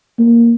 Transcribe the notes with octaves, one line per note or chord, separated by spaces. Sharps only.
A#3